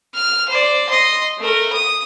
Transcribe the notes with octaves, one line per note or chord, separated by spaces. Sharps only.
F6
C5 D5
D#5 C6
A3 A#4
D#6